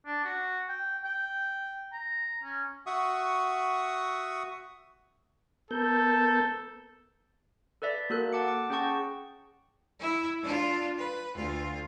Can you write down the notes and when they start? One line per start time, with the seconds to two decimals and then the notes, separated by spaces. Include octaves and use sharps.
0.06 D4
0.24 F#4
0.69 G5
1.04 G5
1.93 A#5
2.43 C#4
2.86 F#4 E5 F#5 C#6 D#6
5.71 B3 A4 A#4 G6
7.82 A4 B4 D5 E5
8.10 A#3 F#4 A4 A#4 F#6
8.33 F#5 A5 D6 C#7
8.48 D6
8.70 C#4 G#4 F#5 G5 A5 C#6
9.99 E4 E5
10.43 D4 F4
10.98 B4
11.34 D2 F4